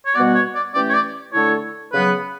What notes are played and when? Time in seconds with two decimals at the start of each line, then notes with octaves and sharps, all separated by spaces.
0.06 C#5
0.15 B2 G3 B3 F#4 D5
0.35 C#5
0.55 D5
0.74 E3 A3 C#4 G4 D5
0.90 C#5
0.94 D5
1.33 D3 A3 E4 A4 C#5
1.92 C#3 F#3 B3 B4